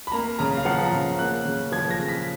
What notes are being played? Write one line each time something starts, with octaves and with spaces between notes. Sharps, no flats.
B5
A#3 A#5
C#3 A#5
F5
F3 F#5
A#5
C#3
A#3 F#6
C#3
F3 G#6
A#6
C#3
B6